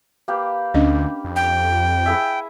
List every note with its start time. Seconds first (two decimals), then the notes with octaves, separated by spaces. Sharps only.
0.28 A#3 G4 B4
0.74 D2 C#4 D4 D#5
1.24 F2
1.36 G5
2.06 E4 G#4 E5